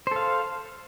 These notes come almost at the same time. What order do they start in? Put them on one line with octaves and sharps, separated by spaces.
C5 A4 F5